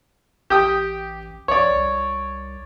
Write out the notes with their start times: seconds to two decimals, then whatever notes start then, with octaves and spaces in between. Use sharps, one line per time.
0.50 A1 G4 G5 D#6
1.48 A#1 C#5 D5
1.75 C2